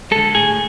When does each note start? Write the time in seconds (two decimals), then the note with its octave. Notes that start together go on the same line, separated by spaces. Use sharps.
0.11 D3 G#3 A4
0.34 A2 G#4